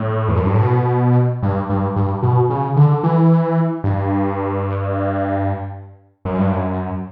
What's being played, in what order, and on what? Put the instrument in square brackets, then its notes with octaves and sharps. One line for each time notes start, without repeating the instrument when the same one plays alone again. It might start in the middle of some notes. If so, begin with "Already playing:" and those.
Already playing: [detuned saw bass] A2
E2
F#2
G2
A2
B2
G2
G2
G2
B2
C#3
D3
E3
G2
F#2
G2
F#2